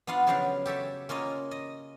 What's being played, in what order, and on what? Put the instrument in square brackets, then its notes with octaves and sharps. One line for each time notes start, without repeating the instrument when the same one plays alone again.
[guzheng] B3 D4 F4 F5 F#5
C#3 F3 F#3 D4 G4 F5
G4 A4 C#5 E5
A#3 C#4 F4 D#5
D#5